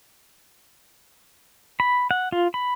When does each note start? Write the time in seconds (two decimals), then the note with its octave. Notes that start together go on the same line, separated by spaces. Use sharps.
1.80 B5
2.11 F#5
2.32 F4
2.54 B5